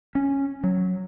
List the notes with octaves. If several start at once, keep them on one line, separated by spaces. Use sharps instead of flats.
C#4
F#3